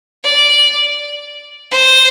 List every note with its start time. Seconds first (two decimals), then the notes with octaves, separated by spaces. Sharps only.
0.24 D5
1.71 C5